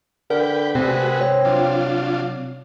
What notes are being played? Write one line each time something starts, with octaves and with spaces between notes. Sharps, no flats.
D3 A#4 B4 G5
C3 G#3 C4 F#4 B4
C#5
F#3 D4 F4